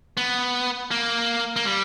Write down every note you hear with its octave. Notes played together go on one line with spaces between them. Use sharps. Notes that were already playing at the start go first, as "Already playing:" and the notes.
B3
A#3
A#3
G3